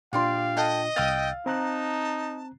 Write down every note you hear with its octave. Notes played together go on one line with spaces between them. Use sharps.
A#2 D4 F4 G4 D5 F5 C6
A4 D#5 F#5 G5
C2 F5 G5 D#6 E6 A6
C4 D#4 A5 A#5 F#6